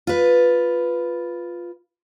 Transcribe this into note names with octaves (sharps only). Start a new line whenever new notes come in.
F4 B4